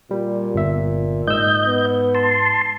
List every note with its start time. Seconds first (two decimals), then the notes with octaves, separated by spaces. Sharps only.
0.11 A#2 G3
0.55 G1 E5
1.27 G#2 D#5 E6 G6
1.66 B3
2.15 A5 C6